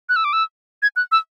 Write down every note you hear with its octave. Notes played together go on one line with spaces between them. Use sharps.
F#6
E6
D6
E6
G#6
F#6
E6